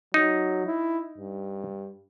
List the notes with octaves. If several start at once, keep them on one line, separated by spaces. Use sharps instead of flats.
F#3 D#4
E4
G2